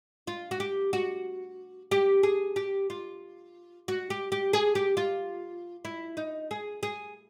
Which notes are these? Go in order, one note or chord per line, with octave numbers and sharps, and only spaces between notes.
F4
F#4
G4
F#4
G4
G#4
G4
F4
F#4
G4
G4
G#4
G4
F4
E4
D#4
G#4
G#4